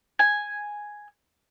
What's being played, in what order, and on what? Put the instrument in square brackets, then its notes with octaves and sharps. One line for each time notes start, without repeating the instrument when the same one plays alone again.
[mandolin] G#5